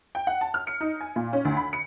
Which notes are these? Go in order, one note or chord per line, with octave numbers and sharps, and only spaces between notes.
G5
F#5
A5
F6
C#7
D#4
G#5
A#2
C#4
D2
B5
C#7